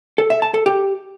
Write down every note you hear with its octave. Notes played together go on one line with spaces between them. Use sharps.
A4
E5
A5
A4
G4